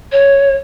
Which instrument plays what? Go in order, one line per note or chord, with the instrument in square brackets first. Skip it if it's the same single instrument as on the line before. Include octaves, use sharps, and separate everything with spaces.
[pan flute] C#5